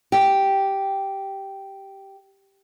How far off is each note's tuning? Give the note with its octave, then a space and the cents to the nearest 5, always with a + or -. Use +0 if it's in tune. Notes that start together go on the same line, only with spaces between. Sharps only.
G4 -5